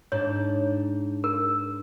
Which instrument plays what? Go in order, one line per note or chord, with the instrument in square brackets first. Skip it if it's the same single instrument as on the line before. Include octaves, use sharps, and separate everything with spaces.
[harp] G#2 D4 [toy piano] C#5
[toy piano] A#4